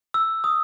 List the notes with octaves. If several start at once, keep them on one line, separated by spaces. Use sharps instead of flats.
E6
D#6